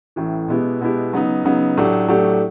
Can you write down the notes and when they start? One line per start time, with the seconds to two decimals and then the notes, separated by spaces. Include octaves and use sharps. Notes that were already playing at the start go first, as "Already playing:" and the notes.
0.16 A1 A2 E3 A3
0.48 B2 G#3 B3 E4 G4
0.81 B2 G#3 B3 E4 G4
1.13 C#3 F#3 B3 D#4
1.44 C#3 F#3 B3 D#4
1.77 A2 F#3 A3 D4 G4
2.08 A2 F#3 A3 D4 G4